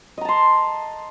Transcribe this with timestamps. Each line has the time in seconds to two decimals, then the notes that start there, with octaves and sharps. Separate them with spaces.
0.18 D#5
0.21 A#5
0.25 A5
0.29 C6